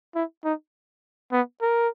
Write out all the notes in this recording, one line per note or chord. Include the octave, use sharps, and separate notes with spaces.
E4
D#4
B3
A#4